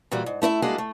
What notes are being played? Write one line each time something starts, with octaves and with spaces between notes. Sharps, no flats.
A#2 E3 G3 F#4
G#2
A3 E4 C5 E5
G3 G#3 A#3 D4 F#4 G#4
A3